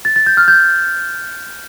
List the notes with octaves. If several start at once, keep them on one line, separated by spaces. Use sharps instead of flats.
A6
A6
G6
F6
G6